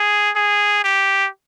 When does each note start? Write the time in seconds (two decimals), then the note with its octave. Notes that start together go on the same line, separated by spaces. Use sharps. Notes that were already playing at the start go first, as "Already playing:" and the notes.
Already playing: G#4
0.35 G#4
0.84 G4